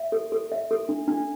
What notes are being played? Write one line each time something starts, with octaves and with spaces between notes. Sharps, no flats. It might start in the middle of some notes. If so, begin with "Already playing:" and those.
Already playing: E5
A4
A4
E5
A4
D4
D4